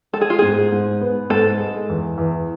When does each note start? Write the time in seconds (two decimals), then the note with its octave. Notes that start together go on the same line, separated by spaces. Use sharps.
0.13 G#3 A4
0.21 G#4
0.30 F4
0.39 G#2 G#4
0.72 G#2
1.01 B3
1.30 G#2 A4
1.59 G#3
1.89 E2
2.18 E2